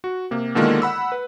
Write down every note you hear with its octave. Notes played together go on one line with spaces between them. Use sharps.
F#4
C3 A#3
B2 D3 D#3 G#3 A#3 F4
F#5 B5 E6
B4